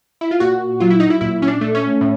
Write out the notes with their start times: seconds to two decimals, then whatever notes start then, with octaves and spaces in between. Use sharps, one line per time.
0.21 E4
0.31 F4
0.40 A#2 F#4
0.80 F#3 F4
0.90 E4
1.00 D#4
1.10 E4
1.21 A#2 E4
1.42 C#4
1.48 D4
1.61 A3
1.75 C#4
2.01 A2